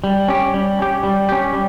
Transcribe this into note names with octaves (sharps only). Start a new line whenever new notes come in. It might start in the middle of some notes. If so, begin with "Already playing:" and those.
G3
C#4 G4
G3
C#4 G4
G3
C#4 G4
G3